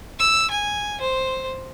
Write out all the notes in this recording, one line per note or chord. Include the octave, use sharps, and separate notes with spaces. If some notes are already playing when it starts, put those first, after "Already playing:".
E6
G#5
C5